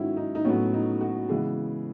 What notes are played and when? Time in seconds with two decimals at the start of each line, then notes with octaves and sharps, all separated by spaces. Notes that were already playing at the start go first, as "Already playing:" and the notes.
Already playing: G#2 D#3 F#3 C#4 E4 F#4
0.17 D#4
0.35 D#4
0.45 A2 F#3 B3 C#4
0.73 D#4
1.01 F#4
1.29 C#3 E3 G#3 B3 G#4